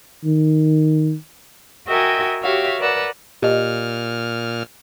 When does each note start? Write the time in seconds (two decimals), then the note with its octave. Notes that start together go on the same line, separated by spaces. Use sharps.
0.24 D#3
1.87 F#4 A#4 D#5 E5 G5 G#5
2.42 F#4 G4 C#5 E5 F5
2.79 A#4 B4 D5 F#5 E6
3.42 A#2 G4 D#5 F6